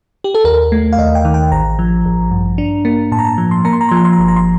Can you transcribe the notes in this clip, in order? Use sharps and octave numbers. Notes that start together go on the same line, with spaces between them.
G4
A4
D#2 A#4
A3
F5
D#2 D#5
G5
D#3
G5
A1 A#5
F3
A1
G2
D4
A#3
A2 A5
A#5
A5
F3
C6
A#3 A#5
C6
A#5
F3 C6
A#5
C6
A#5
G1 C6
A#5
C6